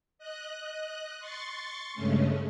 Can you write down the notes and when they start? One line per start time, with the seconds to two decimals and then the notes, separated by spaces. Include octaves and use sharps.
0.18 D#5 F#6
1.18 C6 C#6 A6
1.94 G2 C#3 G#3 A3 C#4